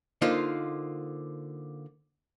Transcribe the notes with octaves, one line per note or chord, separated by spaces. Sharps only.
D3 A#3 D#4 F4 C5